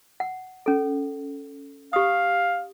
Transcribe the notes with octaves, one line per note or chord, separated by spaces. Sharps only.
F#5
C#4 A4
G4 F5 D#6